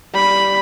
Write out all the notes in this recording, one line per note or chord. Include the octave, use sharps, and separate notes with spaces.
G3 B5